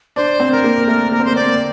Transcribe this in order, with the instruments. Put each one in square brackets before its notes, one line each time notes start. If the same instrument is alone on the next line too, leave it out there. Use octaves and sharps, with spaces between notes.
[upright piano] D4 [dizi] C5
[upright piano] C4
[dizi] A#4
[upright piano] A#3
[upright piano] A3 [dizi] A#4
[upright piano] A#3 [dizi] A#4
[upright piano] C4
[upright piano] A#3 [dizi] C5
[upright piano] C4 [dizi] D5